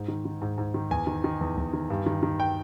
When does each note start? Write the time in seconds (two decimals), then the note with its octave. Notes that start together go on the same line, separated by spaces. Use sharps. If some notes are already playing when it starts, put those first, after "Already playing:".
Already playing: G#2
0.08 D#3
0.25 D#3
0.42 G#2
0.58 G#2
0.74 D#3
0.91 E2 G#5
1.07 D#3
1.24 D#3
1.41 E2
1.57 E2
1.73 D#3
1.90 G2
2.06 D#3
2.23 D#3
2.40 G5